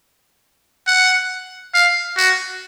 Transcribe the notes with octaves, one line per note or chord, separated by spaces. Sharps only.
F#5
F5
F#4